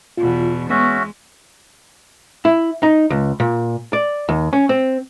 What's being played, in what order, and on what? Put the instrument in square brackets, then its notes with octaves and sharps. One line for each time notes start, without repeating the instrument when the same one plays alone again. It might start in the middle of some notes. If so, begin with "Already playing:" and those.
[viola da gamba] E2 B2 [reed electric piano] F4
[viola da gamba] G#3 [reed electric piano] B3 [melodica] C#4 F#4 E5
[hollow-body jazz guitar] E4
D#4
C#2
A#2
D5
D#2
C#4
C4